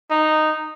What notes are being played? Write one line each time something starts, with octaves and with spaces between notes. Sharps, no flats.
D#4